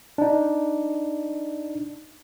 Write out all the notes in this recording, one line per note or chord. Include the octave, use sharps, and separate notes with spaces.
D4 D#4